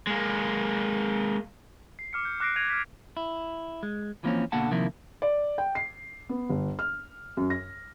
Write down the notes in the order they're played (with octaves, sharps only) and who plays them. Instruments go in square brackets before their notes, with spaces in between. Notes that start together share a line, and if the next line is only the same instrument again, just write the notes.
[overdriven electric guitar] G#3 A#3
[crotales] C7
D6 F6 C#7
G6
D6 F#6 A#6 C7 D7
F#6 G#6 A#6 D7 D#7 F7
F6 B6
[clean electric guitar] E4
G#3
E3 F3 A#3 C4 C#4
B2 D3 A#3 F#5 A5
C3 D#3 F3 A#3 E4
[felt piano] D5
G5
C7
B3
G1
F6
F#2
A#6